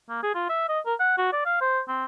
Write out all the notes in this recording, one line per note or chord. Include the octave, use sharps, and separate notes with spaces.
A#3
G#4
F4
E5
D#5
A#4
F#5
F#4
D5
F5
C5
C4